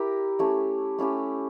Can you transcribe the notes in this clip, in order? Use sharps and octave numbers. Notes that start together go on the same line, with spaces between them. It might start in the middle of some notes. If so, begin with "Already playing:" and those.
Already playing: E4 G4 A#4
A3 C#4 E4 G4
A3 C#4 E4 G4